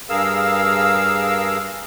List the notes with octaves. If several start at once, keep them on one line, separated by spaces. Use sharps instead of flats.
G2 G#4 A#4 F5 E6